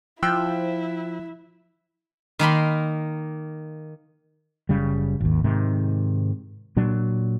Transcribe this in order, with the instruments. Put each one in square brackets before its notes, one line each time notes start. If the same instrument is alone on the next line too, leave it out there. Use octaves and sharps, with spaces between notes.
[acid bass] F3 [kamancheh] E4 [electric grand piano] G5 E6 F#6
[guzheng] D#3 A#3 B5 C6
[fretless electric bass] F#1 C#3 G3
G#1 D#2
G#2 C3 D#3
A#2 F#3 D4